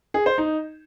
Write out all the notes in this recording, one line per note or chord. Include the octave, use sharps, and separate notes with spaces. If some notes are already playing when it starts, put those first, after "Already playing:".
G#4
C5
D#4